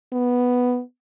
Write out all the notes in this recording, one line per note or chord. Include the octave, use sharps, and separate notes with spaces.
B3